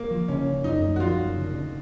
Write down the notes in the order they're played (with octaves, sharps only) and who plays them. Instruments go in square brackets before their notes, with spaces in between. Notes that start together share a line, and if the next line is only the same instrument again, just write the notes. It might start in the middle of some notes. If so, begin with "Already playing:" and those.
Already playing: [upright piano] A#3
[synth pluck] F3
[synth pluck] C#3 [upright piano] C#4
[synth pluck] C#3
[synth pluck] F#2 [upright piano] D#4
[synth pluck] F#2
[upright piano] F#4
[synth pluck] F3 [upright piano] F4
[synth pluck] F#2
C#3
C#3